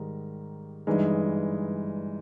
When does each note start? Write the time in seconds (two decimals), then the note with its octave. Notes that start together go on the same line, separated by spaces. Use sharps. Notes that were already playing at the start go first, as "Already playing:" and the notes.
Already playing: G#2 D#3 G3
0.87 G1 G2 E3 G#3 D#4